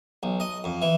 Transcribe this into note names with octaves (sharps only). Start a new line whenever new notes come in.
B1
D#5
F2
E3